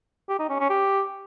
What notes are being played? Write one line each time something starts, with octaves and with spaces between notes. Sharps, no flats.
G4
D#4
C#4
C#4
G4